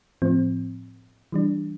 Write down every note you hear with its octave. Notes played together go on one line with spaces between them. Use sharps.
A2 F3 C4
E3 G3 D4